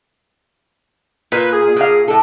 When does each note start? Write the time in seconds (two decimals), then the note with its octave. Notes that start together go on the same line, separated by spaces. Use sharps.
1.32 A#2 B4
1.53 G#4
1.76 A#2 F5
2.08 A2 A4